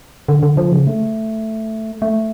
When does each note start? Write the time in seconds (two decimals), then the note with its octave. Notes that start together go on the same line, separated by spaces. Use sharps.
0.29 D3
0.43 D3
0.57 F3
0.72 C#3
0.87 A3
2.02 A3